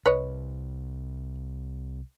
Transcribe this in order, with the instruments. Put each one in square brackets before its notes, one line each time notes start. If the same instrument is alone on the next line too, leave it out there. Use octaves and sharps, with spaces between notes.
[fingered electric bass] C2 [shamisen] B4 C#5 D#5